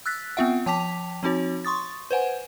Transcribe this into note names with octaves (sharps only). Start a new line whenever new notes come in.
E6 F#6 A6 B6
B3 C4 F4 E5 F#5
F3 G5 A5 D6 B6 F7
F3 C4 D#4 F#4 C#5
C6 C#6 D#6 A6
B4 C5 F#5 G#5